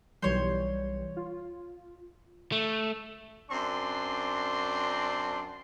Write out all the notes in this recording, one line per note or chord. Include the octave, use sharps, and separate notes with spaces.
B1 E3 G3 C5 C#5
F4
A3
F#2 C4 D4 C6